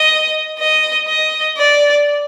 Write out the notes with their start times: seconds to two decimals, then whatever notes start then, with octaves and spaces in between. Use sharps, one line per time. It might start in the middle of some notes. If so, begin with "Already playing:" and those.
Already playing: D#5
0.59 D#5
1.08 D#5
1.58 D5